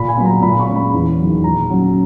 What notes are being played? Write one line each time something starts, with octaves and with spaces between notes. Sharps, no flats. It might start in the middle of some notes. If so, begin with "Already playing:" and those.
Already playing: A#2 B5
G#5
F#3 B3
A#5
A#2 B5
C#6
G#3 C#4
B5
E2
D#3 F#3
A#2 A#5
F#3 C#4